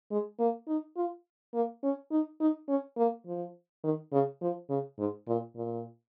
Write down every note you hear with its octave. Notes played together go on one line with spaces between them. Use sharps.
G#3
A#3
D#4
F4
A#3
C#4
D#4
D#4
C#4
A#3
F3
D#3
C#3
F3
C#3
G#2
A#2
A#2